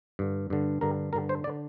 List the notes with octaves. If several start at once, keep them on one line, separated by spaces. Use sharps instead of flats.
G2 D3
G2 D3
G2 D3 A#4
G2 D3 A#4
C5
D5
D3